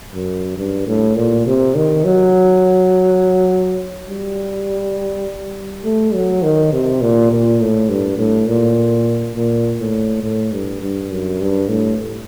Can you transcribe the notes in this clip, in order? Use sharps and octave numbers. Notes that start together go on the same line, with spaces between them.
F#2
G2
A2
A#2
C3
D#3
F#3
G3
A3
F#3
D#3
C3
A#2
A#2
A2
G2
A2
A#2
A#2
A2
A2
G2
G2
F#2
G2
A2